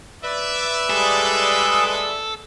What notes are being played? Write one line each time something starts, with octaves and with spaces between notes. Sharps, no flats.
B4 D5 E5
G3 G#3 G#4 A4